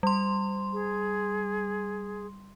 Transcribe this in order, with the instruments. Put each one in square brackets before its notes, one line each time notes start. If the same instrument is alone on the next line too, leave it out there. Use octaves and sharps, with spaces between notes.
[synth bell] G3 C6
[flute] G#4